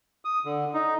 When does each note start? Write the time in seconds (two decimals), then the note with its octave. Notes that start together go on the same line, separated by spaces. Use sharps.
0.25 D#6
0.45 D3
0.74 D#4